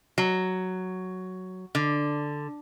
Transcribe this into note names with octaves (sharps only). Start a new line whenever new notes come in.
F#3
D3